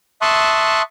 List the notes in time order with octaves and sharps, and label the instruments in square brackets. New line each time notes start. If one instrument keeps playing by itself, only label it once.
[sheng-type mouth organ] E5 A5 C6 C#6 D#6 F#6